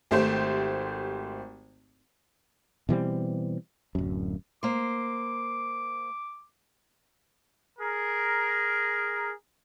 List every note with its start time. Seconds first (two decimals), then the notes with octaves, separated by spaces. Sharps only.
0.11 G#1 A3 G4 C5
2.89 B2 E3 G3 C4
3.95 D1 F#2
4.63 A#3 C5 D6
7.79 G#4 A#4